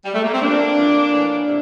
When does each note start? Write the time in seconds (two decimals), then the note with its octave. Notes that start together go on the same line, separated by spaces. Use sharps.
0.05 G3
0.14 A3
0.23 A#3
0.33 C4
0.41 G2 F3 A#3 D4
0.76 F2 E3
1.10 A2 E3
1.46 C3